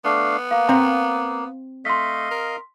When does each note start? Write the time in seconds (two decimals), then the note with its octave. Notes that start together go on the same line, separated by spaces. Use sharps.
0.05 A3 B3 D4 F5
0.51 A#3 F5
0.69 C4 A#5
1.85 A3 D#5 F5 C6 B6
2.31 A#4